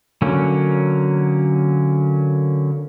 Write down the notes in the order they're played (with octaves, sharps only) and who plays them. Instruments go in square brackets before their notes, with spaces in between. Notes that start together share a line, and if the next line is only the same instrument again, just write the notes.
[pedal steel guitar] D3 F#3 A#3 C#4